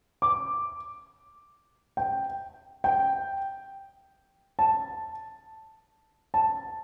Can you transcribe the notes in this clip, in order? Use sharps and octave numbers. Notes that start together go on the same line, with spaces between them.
D6
G5
G5
A5
A5